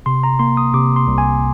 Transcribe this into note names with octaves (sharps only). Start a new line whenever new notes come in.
C3 C6
A#5
A#3 C6
D#6
C3 D6
C6
C2
G#5